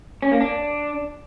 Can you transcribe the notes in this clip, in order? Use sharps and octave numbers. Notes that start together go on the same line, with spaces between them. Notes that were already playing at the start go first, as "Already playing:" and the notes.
C#4
A#3
D4